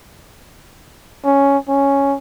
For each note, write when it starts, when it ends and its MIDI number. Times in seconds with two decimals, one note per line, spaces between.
1.25 1.58 61
1.68 2.17 61